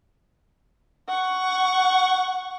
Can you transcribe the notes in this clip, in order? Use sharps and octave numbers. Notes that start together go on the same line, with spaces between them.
F#5 C#6